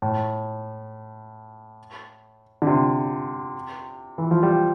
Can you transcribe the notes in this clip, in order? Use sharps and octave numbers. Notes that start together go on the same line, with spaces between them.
A2
D3
C3
E3
F3
G3